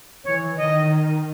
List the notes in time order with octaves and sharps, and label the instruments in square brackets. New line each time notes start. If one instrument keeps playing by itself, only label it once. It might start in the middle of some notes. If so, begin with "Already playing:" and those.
[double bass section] E3 [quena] C#5
[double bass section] D#3 [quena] D#5